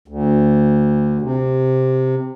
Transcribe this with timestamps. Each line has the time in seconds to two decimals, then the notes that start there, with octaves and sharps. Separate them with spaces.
0.08 D2
1.22 C3